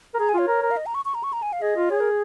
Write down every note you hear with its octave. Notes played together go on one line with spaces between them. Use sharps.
A#4
G#4 A#5
G#5
F4 C#5
A#4
A#4
F5
D#5
A#5
C#6
C#6
A#5
C#6
A#5
G#5
F5
G#4 D#5
F4
G#4 C#5
A#4